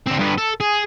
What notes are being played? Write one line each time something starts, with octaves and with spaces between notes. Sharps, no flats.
D3 C4
G2 B3
A4
G#4